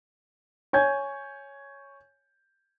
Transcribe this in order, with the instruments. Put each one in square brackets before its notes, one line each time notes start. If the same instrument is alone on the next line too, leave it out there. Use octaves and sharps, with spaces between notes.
[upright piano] C#5 G#5 G6 G#6